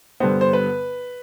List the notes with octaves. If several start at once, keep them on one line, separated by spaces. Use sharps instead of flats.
G2 D3 G3 B3 C5
C5
B4